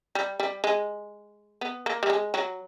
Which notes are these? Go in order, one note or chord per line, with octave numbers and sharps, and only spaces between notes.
G3
G3
G#3
B3
A#3
G3
G#3
F#3